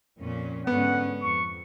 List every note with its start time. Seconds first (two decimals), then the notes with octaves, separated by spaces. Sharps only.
0.17 F2 A#2 C#4
0.67 G#2 D3 B3 C#4 F#5
1.23 F2 C#6